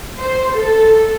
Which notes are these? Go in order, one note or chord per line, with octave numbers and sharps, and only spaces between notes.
C5
A4